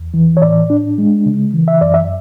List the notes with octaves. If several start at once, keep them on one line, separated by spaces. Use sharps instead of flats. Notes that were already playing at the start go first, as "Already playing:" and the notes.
Already playing: E2
E3
C#5
A2 D5
D4
G#3
C#3
E3
E5
F#2 D5
E5